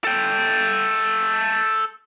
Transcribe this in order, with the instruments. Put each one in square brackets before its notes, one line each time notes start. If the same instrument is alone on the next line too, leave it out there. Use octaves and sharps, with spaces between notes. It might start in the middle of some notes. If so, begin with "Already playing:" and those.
[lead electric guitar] A4 G5